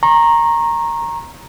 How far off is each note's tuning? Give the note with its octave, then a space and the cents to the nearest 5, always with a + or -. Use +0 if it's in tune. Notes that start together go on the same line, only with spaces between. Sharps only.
A#5 +0 C#6 -35